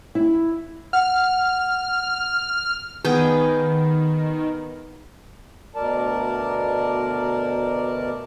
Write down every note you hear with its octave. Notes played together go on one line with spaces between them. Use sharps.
E4
F#5 F6
D#3 B3 G#4 G5
D2 B2 A#4 D5 A5